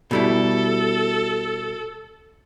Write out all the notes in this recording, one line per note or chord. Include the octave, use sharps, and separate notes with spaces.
B2 G3 E4 A4